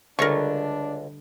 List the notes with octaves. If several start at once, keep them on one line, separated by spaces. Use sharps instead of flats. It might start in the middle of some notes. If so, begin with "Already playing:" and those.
C#2 D3 G3 A3 D4 A#4 C#6